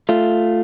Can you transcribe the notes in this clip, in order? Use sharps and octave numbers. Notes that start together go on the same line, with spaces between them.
A3 F4